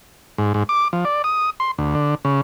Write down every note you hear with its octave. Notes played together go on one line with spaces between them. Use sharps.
G#2
G#2
D6
F3
D5
D#6
C6
D2
D3
C#3